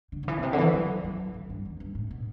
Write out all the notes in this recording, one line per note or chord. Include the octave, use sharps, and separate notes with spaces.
D3
D3
E3
B2
C3
D3
E3
F#3
F#3
E3
G2
E2
G2
A2
B2